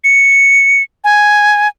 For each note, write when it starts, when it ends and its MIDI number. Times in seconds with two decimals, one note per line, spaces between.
0.04 0.83 97
1.04 1.68 80